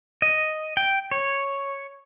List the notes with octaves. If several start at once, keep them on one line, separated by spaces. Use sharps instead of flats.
D#5
G5
C#5